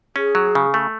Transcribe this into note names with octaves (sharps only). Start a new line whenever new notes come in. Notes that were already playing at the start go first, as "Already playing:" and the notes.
C#4 G#4
F#3
C#3
A3